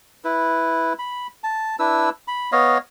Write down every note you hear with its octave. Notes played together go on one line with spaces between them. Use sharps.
E4 B4
B5
A5
D4 E4 B4 E6
B5
B3 C#5 D#5 F5